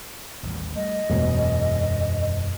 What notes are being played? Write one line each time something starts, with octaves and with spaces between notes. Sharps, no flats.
A1 D#2 G3
G3 A3 D#5
E1 F#2 C#4